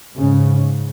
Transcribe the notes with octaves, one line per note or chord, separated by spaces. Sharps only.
G#2 C#3